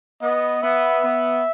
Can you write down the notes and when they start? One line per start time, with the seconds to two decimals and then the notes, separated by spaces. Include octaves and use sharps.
0.22 B3 D#5
0.63 B3 E5
1.04 B3